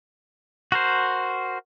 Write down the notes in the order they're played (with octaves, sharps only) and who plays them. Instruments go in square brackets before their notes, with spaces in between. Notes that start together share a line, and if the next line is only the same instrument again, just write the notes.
[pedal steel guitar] F#4 A#4 C5